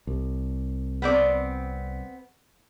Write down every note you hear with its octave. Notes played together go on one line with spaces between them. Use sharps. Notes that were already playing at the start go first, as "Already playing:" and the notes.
C2
B3 C4 D5